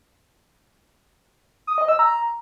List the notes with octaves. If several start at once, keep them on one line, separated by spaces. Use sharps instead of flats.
D#6
D#5
E6
A#5